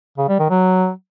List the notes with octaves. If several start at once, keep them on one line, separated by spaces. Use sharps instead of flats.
C#3
G3
D#3
F#3